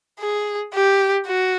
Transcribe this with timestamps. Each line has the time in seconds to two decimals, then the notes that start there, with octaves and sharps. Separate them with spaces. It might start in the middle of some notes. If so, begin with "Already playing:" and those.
0.20 G#4
0.74 G4
1.27 F#4